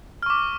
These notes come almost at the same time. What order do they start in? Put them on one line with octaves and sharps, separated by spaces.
F6 C#6 D6